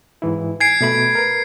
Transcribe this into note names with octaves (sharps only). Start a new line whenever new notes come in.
G#2 E3 E4
G#5 G#6 C7 D7
B2 A3 B5
A#4 B4